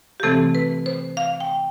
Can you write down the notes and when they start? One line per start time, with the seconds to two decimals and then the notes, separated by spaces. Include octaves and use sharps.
0.20 G4
0.23 C3 E3 A3 C4 A4
0.55 B4
0.86 C5
1.17 F5
1.40 G5